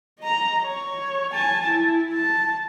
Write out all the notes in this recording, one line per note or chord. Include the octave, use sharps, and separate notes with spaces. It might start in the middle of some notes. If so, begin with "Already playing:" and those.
D#5 A#5
C#5
G#5 A5
E4
A5